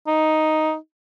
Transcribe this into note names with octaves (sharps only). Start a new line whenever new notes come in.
D#4